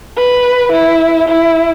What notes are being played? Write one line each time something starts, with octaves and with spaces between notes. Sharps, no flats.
B4
E4
E4